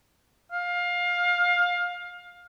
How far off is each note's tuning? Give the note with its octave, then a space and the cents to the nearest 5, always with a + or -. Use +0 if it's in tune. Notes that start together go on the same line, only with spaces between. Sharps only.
F5 +20